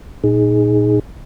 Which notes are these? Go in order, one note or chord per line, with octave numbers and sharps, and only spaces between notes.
A#2 D#4 G#4